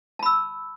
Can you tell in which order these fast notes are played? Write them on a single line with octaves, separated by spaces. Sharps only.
A5 B5 E6